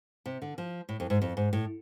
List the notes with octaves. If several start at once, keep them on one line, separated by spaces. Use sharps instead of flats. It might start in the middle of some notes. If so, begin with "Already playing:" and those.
C3
D3
F3
A2
F2
G#2
F2
G#2
A2